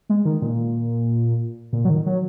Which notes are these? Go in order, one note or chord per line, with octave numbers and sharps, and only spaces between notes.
G#3
D#3
A#2
A#2
F#3
D#3
F#3